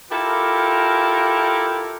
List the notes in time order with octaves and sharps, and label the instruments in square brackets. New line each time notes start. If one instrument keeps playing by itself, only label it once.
[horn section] E4 F4 G4 A4 A#4